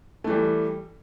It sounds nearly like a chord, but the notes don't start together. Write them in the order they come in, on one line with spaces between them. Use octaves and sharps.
A3 E3 G3